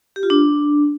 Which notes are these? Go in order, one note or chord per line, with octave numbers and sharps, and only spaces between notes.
G4
F4
D4